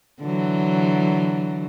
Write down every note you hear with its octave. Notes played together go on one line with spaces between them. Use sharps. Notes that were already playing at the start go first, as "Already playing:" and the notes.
D3 E3 F#3